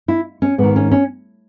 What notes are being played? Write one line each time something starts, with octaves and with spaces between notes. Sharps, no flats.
E4
C#4
G#2 D#3 B3
C#4
C#4